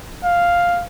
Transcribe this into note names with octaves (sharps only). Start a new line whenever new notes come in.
F5